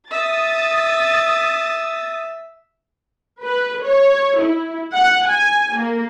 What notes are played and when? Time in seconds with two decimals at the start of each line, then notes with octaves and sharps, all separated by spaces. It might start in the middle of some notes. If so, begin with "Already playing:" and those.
0.11 E5 D#6 A6
3.44 B4
3.83 C#5
4.39 E4
4.95 F#5
5.28 G#5
5.76 A#3